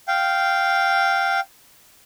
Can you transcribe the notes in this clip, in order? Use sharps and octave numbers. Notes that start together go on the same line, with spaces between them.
F5 G5